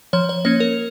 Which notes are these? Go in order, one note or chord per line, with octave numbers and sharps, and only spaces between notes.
F3 C#5
C#5
A#3 C#4 C#5
A#4